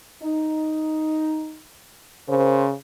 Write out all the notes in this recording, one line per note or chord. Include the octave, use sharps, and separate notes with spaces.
D#4
C#3 A#4 C5